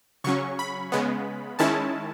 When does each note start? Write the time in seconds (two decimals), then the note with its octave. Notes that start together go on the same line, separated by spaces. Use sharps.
0.24 C#3 F#3 C#4 C#6
0.59 B5
0.92 C#3 G#3 B3
1.59 D#3 G#3 C#4 E4 A5